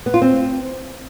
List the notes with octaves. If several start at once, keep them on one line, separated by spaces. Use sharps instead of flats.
B3
F4
C4